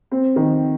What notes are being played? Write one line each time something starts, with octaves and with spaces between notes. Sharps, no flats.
C4
D#3